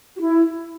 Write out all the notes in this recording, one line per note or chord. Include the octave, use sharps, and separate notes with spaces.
F#4
E4